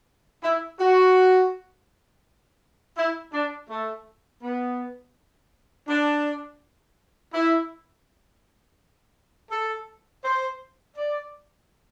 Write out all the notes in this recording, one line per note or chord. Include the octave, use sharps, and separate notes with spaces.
E4
F#4
E4
D4
A3
B3
D4
E4
A4
C5
D5